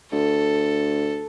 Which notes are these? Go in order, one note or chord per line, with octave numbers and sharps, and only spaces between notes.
D2 A4